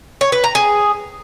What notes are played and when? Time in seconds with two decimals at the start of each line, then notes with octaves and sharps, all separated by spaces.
0.21 C#5
0.32 B4
0.44 A#5
0.55 G#4